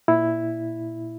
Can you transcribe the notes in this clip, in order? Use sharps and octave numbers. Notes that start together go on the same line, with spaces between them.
A#2 E4